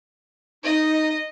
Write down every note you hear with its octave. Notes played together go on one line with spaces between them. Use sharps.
D#4 D#5